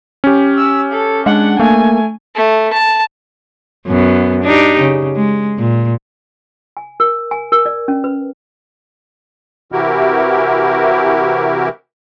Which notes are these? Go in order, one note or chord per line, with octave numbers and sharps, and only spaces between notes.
C#4 G4
E6
A4
G#3 D4 F#5
A3 A#3 G#5
A3
A5
F#2 B3
D4 D#4 G4
C#3
G#3
A#2
G#5
A#4
G#5
A#4
D5
C#4
B4
C3 E3 E4 F#4 G4 A#4